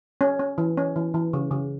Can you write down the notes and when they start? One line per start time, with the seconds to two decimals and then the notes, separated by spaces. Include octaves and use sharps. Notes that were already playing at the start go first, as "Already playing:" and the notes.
0.21 C#4
0.39 C#4
0.58 E3
0.77 C#4
0.96 E3
1.14 E3
1.33 C#3
1.51 C#3